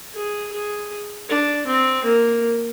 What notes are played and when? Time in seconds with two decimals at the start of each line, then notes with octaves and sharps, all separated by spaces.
0.14 G#4
0.53 G#4
1.29 D4
1.67 C4
2.04 A#3